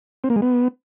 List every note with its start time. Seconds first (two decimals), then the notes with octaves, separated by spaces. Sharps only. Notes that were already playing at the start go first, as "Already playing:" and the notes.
0.24 C4
0.30 A#3
0.36 G#3
0.42 B3